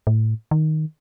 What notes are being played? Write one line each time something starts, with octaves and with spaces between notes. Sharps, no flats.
A2
D#3